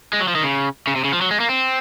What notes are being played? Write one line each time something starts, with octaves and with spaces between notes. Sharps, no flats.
G#3
F#3
F3
D#3
C#3
C#3
C3
C#3
F3
F#3
G#3
A#3
C4